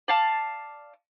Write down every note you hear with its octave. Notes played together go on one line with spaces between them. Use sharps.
D5 F5 A5